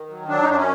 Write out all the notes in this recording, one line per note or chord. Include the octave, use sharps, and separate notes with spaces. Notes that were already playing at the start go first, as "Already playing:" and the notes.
Already playing: D#3
F#3
F#3 D4
D#4
F#2 D4
C#4